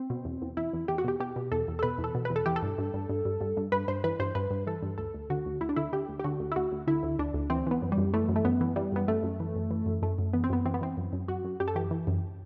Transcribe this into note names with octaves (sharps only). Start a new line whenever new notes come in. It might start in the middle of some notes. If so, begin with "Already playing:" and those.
Already playing: C4
B2
E2
E2
E2 E4
E2
E2 G4
F#4
B2 G4
B2 G4
B2
E2 A4
E2
A4
B2 B4
E2
A4
B2
E2 B4
A4
E3 G4
A4
G2
G2
G2
G2
G2
G2
G2
G2 B4
G2 C5
E3 B4
G2 C5
G2 B4
G2
E3 A4
G2
D2 A4
D2
D3 F#4
D2
D2 E4
D4
D3 E4
D3 G4
D2
G4
D3 F#4
D2
E4
D2 F#4
D2
D3 E4
D2
D2 D4
D2
E3 C4
E3 B3
F#2
G3
F#2
E3 A3
F#2
A3
F#2 B3
E3
E3 G3
F#2 B3
F#2 A3
F#2
E3
F#2
E3
F#2
F#2 A3
F#2
E3 B3
C4
F#2 B3
E3 C4
B3
E3 C4
F#2
F#2
F#2 F#4
F#2
F#2 G4
A4
E3 G4
E3
F#2